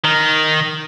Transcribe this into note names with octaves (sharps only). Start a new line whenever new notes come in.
D#3